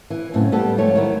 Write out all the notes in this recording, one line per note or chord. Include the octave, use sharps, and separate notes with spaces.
E3
F#2 A2 C#3 C4
G3 B3 G4 A4
G#2 F3 A3 C#5
D#3 F#3 E4